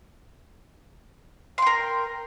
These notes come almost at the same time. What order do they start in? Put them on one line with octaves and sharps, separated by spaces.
C6 G5 A#4